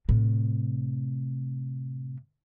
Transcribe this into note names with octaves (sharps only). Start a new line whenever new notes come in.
A2 C3